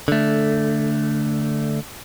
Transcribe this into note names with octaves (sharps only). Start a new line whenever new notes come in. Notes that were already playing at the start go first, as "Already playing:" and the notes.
D3 A3